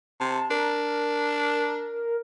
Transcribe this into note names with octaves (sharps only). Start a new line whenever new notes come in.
C3 A5
D4 A#4